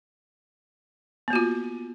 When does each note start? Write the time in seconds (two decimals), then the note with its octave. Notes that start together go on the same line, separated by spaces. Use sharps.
1.28 B3
1.30 A#3
1.33 F#4
1.36 F4